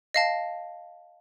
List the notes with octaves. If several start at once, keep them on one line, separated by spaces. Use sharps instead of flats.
D#5 F5 A5